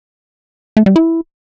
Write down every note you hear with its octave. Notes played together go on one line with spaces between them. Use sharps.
A3
G3
E4